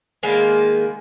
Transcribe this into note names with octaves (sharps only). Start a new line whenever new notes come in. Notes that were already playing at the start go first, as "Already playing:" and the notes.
D#3 G#3 A#3 B3